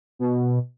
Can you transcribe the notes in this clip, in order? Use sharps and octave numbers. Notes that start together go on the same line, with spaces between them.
B2